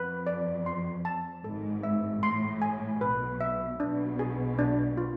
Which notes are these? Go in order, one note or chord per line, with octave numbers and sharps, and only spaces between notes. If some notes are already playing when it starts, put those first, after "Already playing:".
Already playing: F2 B4
D5
C6
A5
G#1 G#2 A4
E5
A1 A2 C6
G#5
B1 B2 B4
E5
B1 B2 D4
G#4
D4
F4